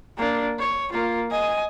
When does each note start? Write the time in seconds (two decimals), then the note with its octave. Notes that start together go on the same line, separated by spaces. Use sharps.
0.17 A#3 D4
0.59 C#5
0.92 A#3 F4
1.30 D#5 G#5